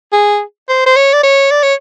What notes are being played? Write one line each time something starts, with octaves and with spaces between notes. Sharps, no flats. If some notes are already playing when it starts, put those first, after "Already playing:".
G#4
C5
C5
C#5
D5
C#5
D5
C#5